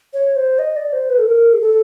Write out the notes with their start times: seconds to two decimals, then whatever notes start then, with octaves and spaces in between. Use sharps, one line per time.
0.13 C#5
0.36 C5
0.59 D#5
0.76 D5
0.93 C5
1.10 B4
1.18 A4
1.27 A#4
1.53 G#4
1.61 A4